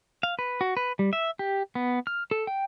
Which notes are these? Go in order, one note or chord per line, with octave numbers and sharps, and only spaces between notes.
F5
B4
F#4
B4
G3
E5
G4
B3
F6
A4
G5